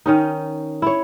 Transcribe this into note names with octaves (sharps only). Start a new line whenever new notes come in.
D#3 C#4 D#4
E4 C#5